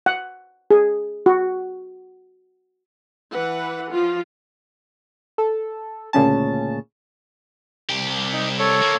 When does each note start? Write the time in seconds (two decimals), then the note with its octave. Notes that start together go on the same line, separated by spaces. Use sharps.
0.06 F#5
0.71 G#4
1.26 F#4
3.33 E3 B4 F#5
3.90 F3 F4
5.38 A4
6.13 D2 A#2 C#3 C#4 A5
7.89 C2 G4
8.33 D#4
8.59 A4 C#5
8.81 D3 A#3